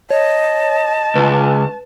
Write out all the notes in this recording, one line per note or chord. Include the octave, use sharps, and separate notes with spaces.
C#5 D#5 A5
C#2 B4